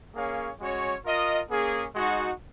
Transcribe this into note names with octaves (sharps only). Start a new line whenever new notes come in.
A#3 C#4 G#4 C#5 F5
G#3 C#4 F#4 C#5
F4 A#4 D#5
A#3 C#4 G#4
G#3 D#4 F#4